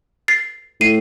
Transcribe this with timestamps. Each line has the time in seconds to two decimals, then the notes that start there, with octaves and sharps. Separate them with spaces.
0.28 A6 C7
0.80 A2 C7 D#7